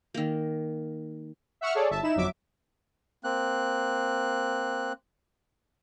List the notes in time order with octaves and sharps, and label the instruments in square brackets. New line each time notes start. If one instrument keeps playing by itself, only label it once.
[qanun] D#3 A#3
[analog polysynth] E5 F#5 C#6 E6 F6
G#4 A4 C#5 D5
G1 E5 A5
D#4 E4 E7
G1 F2 F#3 E5 D6
[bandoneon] A#3 C4 F#6